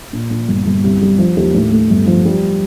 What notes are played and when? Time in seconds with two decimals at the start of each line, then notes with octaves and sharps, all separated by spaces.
0.13 A#2
0.31 A#2
0.48 G1
0.66 G1
0.83 C2
1.01 G3
1.18 F3
1.36 D#2
1.54 A2
1.72 A3
1.90 G1
2.06 F3
2.25 G3